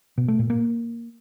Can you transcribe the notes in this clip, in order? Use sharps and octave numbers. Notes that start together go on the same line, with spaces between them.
B2
A3
A#2
A#3